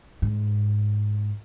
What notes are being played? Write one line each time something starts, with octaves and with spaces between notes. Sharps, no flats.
G#2